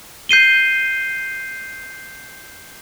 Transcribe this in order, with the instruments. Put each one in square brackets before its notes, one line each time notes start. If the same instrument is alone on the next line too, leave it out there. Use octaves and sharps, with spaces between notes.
[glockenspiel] G6 C7 D#7 G7